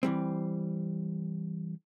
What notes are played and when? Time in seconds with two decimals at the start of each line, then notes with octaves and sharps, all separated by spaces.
0.03 E3 G3 C4